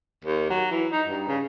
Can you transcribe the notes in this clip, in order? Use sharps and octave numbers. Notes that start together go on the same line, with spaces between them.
D#2
F#3
E3
D#4
G2
C#3